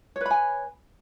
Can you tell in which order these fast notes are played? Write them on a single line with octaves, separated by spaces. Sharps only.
C#5 B4 B5 G#5